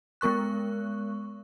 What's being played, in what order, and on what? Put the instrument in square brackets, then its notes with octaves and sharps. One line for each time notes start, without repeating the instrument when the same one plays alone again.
[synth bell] G#3 B3 A#4 C#6 F#6